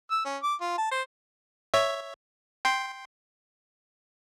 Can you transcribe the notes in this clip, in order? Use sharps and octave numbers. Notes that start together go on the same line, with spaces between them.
E6
C#4
D6
F4
A5
C5
C#5 E5
G5 C6